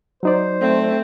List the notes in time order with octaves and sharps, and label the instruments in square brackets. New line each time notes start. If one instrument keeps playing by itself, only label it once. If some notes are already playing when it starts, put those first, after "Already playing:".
[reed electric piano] F#3 D#4 D5 [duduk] C5
[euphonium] A3 [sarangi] C4